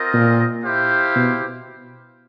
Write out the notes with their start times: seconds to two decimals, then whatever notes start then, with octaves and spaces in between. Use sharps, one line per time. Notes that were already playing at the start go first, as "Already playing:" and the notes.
Already playing: C4 F4 A#4 D#5
0.14 A#2
0.64 E4 G4 C5 F5
1.16 B2